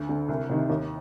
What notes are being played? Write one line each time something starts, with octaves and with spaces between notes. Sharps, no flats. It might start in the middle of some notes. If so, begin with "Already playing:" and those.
Already playing: D2
D3
C2
C3 D#3
D#2